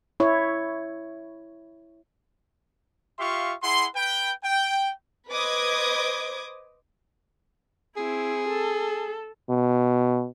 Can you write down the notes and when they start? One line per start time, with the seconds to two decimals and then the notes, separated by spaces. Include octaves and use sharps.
0.20 E4 C#5
3.19 F4 G4 E5 F5 C6 C#6
3.63 E4 G#4 F#5 C6
3.95 B4 G5
4.44 G5
5.30 B4 C5 D#5 D6 D#6 G#6
7.96 C4 E4 G#4
8.48 A4
9.49 B2